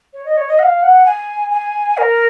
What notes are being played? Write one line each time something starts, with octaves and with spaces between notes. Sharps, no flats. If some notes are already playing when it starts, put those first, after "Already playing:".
C#5
D#5
C#5
D#5
F#5
F5
F#5
G#5
G#5
A#4